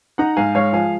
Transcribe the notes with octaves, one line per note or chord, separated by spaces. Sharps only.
D#4 F#5 A#5
G#2 F5 G#5
G#3 C#5 F5
F3 F5 G#5